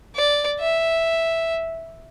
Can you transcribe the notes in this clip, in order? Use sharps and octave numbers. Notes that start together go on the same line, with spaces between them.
D5
E5